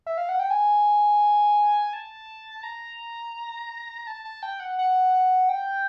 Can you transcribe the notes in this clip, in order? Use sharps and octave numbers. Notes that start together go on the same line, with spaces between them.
E5
F5
F#5
G5
G#5
A5
A#5
A5
A5
G5
F#5
F#5
F#5
G5